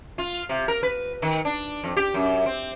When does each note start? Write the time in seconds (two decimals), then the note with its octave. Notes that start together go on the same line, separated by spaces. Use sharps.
0.18 F4
0.49 C3
0.68 A#4
0.83 B4
1.22 D#3
1.45 D4
1.84 F2
1.97 G4
2.14 F#2
2.46 C4